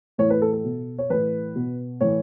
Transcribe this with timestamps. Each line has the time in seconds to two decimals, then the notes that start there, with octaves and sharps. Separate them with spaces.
0.18 A2 E3 C#5
0.30 B4
0.42 A4
0.53 A4
0.64 B2
0.98 C#5
1.10 A2 E3 B4
1.55 B2
2.01 A2 E3 C#5